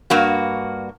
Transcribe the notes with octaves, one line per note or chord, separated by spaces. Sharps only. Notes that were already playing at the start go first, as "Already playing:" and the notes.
G2 A#3 F#4